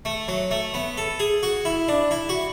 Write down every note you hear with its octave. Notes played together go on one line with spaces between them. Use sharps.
A3
F#3
A3
B3
A4
G#4
F#4
E4
D4
E4
F#4